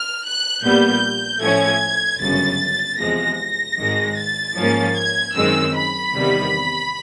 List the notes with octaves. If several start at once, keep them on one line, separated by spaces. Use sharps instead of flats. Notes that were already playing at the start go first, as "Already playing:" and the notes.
Already playing: F6
F#6
A#1 A#2 G3 B3 G6
A2 F3 A3 C#4 G#6
G1 F#2 C#3 A6
E2 C3 F3 G#3 A#6
G#1 G#2 D#3 G#3
A6
G#2 F3 A#3 C#4
G#6
F#2 D#3 G#3 C4 E6
B5
E2 C3 D#3 G3 B3